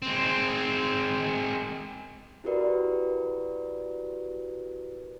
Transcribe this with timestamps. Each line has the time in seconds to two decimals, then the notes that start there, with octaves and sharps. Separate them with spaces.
0.02 G#3 C4
2.44 E4 F#4 G4 A#4 B4 D5